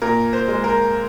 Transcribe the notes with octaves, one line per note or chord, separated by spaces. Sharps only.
A#2 A#4
C5
G#3
A#4